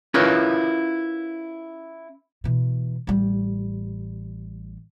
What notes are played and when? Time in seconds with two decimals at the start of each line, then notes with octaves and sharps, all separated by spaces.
0.14 C#4 E4 F4 A#4 B4
2.44 B2 E3
3.07 A1 G3